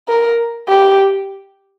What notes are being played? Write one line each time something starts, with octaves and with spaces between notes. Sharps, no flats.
A#4
G4